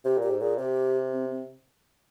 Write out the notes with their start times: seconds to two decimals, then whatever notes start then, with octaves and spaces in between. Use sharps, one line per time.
0.05 C3 G4
0.17 A#2
0.23 G4
0.30 G#2
0.41 A#2 G#4
0.58 C3 G4
1.12 C4
1.30 C4